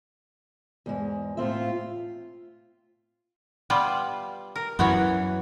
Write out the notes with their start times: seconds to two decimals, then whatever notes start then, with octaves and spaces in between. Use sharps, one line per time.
0.86 E2 G#2 G#3
1.37 A2 C4 F4 E5
3.70 G3 B3 F4
4.56 A#4
4.79 F#2 E3 B3 F#4 C#5